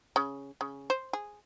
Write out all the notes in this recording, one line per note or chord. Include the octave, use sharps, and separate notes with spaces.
C#3
C#3
C5
G#4